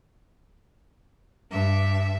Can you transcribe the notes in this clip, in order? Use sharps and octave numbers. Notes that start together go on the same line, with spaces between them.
G2 E5